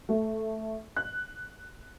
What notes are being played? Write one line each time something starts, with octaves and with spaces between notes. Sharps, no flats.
A3
F#6